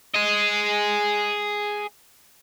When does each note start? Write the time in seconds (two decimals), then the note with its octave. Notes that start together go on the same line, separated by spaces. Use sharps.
0.15 G#4 D#5